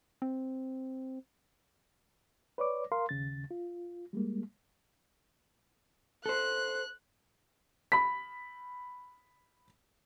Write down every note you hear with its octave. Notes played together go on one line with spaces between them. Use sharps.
C4
B4 C#5 D5 D6
A#4 F5 C6
D#2 C#3 A6
F4
G3 G#3 A#3
A4 C5 F#6
B5 B6